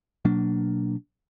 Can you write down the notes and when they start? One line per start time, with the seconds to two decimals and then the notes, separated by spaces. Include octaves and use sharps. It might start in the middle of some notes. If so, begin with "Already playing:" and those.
0.25 B2 F#3 A#3 D4